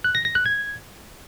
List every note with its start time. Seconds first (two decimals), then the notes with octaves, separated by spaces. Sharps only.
0.04 F#6
0.15 A#6
0.25 A#6
0.35 F#6
0.46 G#6